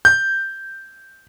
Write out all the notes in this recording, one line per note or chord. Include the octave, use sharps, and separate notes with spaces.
G6